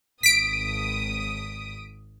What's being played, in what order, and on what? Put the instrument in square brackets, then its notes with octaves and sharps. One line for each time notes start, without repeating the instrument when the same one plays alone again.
[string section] G#1 D#6 [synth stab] B6 D7